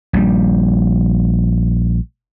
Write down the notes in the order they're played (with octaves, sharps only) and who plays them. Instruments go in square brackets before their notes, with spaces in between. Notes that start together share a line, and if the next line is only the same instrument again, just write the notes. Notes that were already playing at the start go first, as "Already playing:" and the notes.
[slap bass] A#1 G3